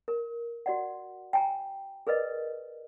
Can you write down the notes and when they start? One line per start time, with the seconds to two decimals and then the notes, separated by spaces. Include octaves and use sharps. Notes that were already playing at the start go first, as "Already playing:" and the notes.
0.08 A#4
0.66 F#4 D5 F#5
1.33 G5 G#5 A#5
2.07 G#4 A#4 B4 D5 D#5